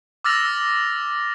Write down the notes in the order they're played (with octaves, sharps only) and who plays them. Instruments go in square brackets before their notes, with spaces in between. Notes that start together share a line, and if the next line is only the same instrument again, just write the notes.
[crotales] D6 E6 F6 A6 A#6 F7